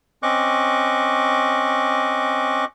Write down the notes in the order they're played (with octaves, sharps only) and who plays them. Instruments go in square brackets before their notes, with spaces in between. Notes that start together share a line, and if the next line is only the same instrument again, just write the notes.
[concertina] C4 C#4 D#5 C#6 D6 F#6